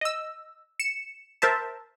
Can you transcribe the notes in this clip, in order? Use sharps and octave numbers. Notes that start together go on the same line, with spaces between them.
D#5 E6
C#7 E7
A#4 C5 E5 A5